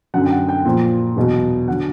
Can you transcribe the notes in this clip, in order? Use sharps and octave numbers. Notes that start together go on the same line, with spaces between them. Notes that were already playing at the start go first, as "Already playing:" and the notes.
F#2 D3 F#3 F#5
G5
F#5
G5
A#2 F3
E2 B2 F#3
D3 F#3 F#5